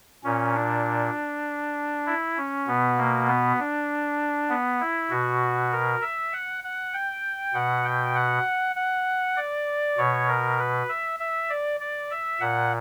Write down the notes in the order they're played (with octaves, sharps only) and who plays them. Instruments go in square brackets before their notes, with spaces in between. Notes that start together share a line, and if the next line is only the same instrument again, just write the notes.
[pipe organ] A#2 C#4
D4
E4
C#4
B2 B3
A#3
B3
D4
B3
E4
B2 F#4
A#4
E5
F#5
F#5
G5
B2 F#5
G5
F#5
F#5
D5
B2 C#5
A#4
B4
E5
E5
D5
D5
E5
A#2 F#5